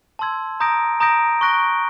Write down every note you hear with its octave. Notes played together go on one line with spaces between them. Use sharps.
A5 C6 E6 G#6
A#5 D#6 G6 A#6 D7
A#5 D#6 G6 A#6 D7
C#6 F#6 A#6 D7 G7